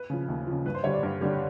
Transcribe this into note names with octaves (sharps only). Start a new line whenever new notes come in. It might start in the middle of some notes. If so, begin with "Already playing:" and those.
Already playing: B4
C#3 F3
D#2
C#3 F3
G2 B4
C5
D3 G3 C#5
D5
G2
D3 G3